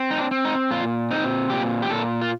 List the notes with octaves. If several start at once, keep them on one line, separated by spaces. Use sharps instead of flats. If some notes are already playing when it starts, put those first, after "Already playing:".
Already playing: C4
D#4
D4
C4
D#4
A#2 F4
C4 D#4
A#2 G4
G4
A#2 A4
F4